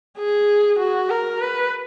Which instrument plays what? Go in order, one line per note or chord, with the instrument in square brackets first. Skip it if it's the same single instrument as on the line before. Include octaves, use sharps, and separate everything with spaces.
[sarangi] G#4
F#4
A#4
B4